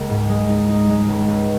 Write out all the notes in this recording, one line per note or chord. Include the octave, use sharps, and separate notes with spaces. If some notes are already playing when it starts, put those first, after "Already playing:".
Already playing: C#2 A#3
G#2
G#3
D#4
D#4
G#3
C#2
C#2